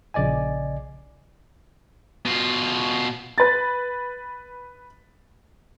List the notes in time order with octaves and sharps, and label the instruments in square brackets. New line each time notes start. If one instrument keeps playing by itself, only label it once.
[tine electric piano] A#1 C#3 D5 D#5 G#5
[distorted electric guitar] B2 F4
[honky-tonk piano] B4 A6